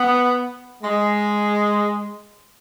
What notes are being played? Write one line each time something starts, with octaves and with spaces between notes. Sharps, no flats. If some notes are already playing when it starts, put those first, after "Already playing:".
Already playing: B3
G#3